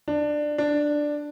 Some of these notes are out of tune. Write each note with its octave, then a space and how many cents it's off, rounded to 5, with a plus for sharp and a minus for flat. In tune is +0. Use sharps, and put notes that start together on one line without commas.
D4 +15
D4 +5